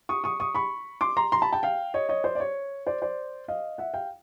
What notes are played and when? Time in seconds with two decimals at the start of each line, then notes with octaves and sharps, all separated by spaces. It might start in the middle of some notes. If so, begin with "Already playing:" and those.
0.09 C#6 D#6
0.24 C#6 D#6
0.40 C#6 D#6
0.55 B5 C#6
1.01 C6 D6
1.17 A#5 C6
1.32 A#5 C6
1.42 A5 B5
1.53 G5 A5
1.63 F5 G5
1.94 C#5 D#5
2.09 C#5 D#5
2.24 C5 D5
2.35 D5
2.40 C#5
2.87 C5 D5
3.02 C5 D5
3.48 D#5 F5
3.78 E5 F#5
3.93 F5 G5